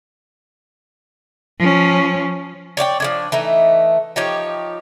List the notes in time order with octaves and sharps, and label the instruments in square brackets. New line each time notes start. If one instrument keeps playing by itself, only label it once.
[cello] F3 C#4
[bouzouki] C#5 D5 F5 G5
F3 G#3 D4
E3 A3 D#4
F3 D#4 G4 C#5